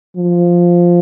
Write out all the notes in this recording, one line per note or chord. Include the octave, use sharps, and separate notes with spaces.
F3